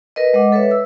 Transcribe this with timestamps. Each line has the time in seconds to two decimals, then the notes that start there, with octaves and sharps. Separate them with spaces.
0.16 A#4 B4 D#5
0.34 G#3 D#5 F#5 D6
0.52 A4 B4 C#5 E5
0.71 E6